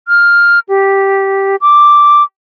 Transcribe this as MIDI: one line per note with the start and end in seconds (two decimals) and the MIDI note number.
0.08 0.59 89
0.69 1.56 67
1.61 2.23 86